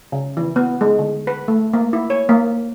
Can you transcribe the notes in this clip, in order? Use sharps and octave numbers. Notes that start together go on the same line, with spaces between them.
C#3
E3
B3
G#3
D3
B4
A3
A#3
E4
C#5
A#3